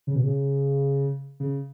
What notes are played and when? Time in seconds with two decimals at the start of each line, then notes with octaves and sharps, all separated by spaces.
0.07 C#3
0.15 B2
0.24 C#3
1.40 C#3